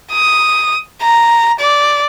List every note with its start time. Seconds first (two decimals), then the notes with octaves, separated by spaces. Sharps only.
0.12 D#6
1.02 A#5
1.60 D5